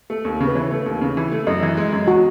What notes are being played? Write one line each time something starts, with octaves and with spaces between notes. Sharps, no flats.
A3
D#2
C#3
B4
E3 C#5
A3
D#2
C#3
E3
A3
F#2 D#5
E3
G#3
F#2
F#4